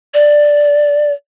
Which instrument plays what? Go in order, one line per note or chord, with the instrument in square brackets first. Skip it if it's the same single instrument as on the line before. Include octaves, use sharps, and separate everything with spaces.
[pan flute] D5